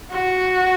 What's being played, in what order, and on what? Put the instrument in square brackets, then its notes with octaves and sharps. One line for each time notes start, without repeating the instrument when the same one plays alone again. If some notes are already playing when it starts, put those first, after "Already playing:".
[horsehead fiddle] F#4